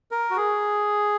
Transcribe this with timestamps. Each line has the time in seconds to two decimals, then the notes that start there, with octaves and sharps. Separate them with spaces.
0.11 A#4
0.31 F#4
0.37 G#4